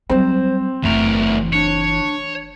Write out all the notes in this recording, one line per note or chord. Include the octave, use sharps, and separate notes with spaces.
F#3 G3 C4 C5
F#1 E2 E3 A3 A#4
D4 C#5